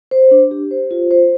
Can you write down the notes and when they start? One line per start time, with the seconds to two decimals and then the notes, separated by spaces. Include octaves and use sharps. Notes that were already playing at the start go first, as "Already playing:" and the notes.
0.11 C5
0.31 D4
0.51 G4
0.71 C5
0.91 F4
1.11 C5